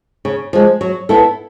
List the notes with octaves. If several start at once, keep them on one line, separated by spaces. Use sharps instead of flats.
C#3
F3 G#3
F#3
B3 E4 A4